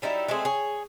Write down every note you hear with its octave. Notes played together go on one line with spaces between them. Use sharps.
F#3 G3 D#4 E4
G#3 A3 C4 G#4
G#4 C#5